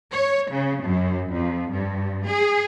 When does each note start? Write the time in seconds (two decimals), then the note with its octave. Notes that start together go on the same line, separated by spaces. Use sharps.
0.11 C#5
0.51 C#3
0.83 F#2
1.32 F2
1.72 G2
2.26 G#4